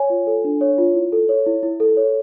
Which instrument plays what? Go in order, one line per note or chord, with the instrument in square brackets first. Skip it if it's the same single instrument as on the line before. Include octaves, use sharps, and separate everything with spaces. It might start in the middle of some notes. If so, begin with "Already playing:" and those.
Already playing: [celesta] C#5 G#5
F4
A4
D4
C#5
F4
E4
A4
C#5
E4
E4
A4
C#5